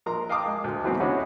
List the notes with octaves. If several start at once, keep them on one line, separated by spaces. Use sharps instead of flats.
A#1 A#4 A#5 C6
D#5 F5 G5 A5 D6 D#6
G#3
D2
D#3 E3 F#3 G#3 B3 C4
D3 B3 C#4 E4 F#4 C#5